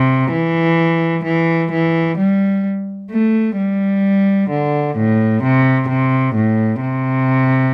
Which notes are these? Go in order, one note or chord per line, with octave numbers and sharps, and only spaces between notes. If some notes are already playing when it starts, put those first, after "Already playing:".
Already playing: C3
E3
E3
E3
G3
A3
G3
D3
A2
C3
C3
A2
C3